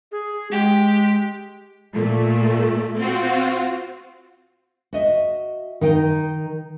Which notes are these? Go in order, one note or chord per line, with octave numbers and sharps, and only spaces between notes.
G#4
G#3 G4
A#2 A3
C4 F4 F#4
F#4 D#5 E5
D#3 D#4 G5